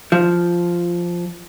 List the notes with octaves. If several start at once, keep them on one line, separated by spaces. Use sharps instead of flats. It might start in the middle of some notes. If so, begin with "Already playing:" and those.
F3